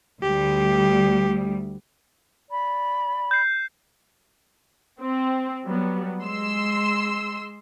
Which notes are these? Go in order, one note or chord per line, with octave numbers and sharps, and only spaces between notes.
D2 G3 G4
D5 B5
G6 C7
C4
F#3 G3 B3
G#3 C6 E6